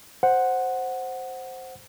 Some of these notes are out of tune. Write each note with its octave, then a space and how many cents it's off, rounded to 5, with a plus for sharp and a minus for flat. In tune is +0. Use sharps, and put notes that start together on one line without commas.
C5 +0 F#5 +0